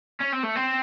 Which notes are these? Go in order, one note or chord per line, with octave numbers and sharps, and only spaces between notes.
C#4
C4
A3
C4